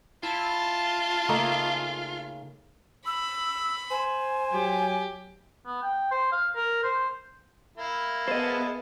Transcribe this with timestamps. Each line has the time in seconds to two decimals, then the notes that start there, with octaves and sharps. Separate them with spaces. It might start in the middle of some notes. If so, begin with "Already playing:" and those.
0.23 E4 F4 A5
1.29 C#3 A3 A#3 D#4
3.06 B5 E6
3.91 C5 G#5
4.53 F#3 G4
5.66 B3
5.83 G5
6.11 C5
6.32 F5
6.55 A#4
6.84 C5
7.78 A#3 E4
8.28 B3 G#4 C5 D#5 A5